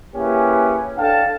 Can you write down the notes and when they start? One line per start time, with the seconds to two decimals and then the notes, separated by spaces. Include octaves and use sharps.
0.15 A#3 C#4 E4 G4 G#4 B4
0.97 D4 A4 F5 G5 A5